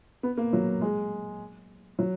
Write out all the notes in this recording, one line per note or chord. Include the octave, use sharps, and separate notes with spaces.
B3
A#3
F#3
G#3
F#3